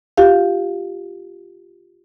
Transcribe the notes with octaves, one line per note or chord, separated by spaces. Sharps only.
F4 G4 F5